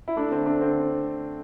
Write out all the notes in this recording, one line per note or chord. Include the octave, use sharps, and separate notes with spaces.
E4
A3 D4
D3 C4
A3 D4
D3 C4